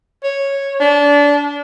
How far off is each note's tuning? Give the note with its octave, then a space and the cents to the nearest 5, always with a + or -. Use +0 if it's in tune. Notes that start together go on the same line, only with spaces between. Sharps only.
C#5 -5
D4 -25